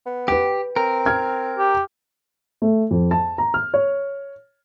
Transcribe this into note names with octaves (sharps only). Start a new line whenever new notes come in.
B3
G4 B4 G5
C4 A#4
F6 G#6
G4
A3
F2
A5
A#5
F6
C#5